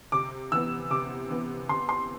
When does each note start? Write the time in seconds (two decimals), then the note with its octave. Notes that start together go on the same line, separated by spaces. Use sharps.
0.12 C3 D6
0.52 E3 B3 E6
0.91 C3 D6
1.30 E3 B3
1.69 C3 C6
1.89 C6